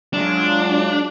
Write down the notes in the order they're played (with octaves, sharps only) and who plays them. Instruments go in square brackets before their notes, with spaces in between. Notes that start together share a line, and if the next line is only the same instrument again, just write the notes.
[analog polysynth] F#3 G#3 F4 [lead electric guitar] D4